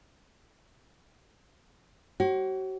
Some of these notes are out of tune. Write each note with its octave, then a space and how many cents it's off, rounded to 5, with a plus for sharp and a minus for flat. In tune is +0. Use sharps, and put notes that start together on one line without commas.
F#4 +40 C#5 -35